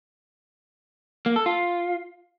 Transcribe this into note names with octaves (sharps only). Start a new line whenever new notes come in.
A#3
A4
F4